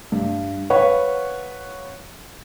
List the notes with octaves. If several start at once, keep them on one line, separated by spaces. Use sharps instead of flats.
G2
B4 C#5 F5 F#5 B5 C#6